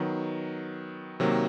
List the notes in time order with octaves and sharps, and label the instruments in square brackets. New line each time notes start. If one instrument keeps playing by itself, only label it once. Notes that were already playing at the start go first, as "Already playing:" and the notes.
Already playing: [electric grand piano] D#3 F#3 B3
C3 D#3 F#3 A#3